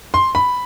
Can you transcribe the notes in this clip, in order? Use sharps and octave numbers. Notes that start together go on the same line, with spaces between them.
C6
B5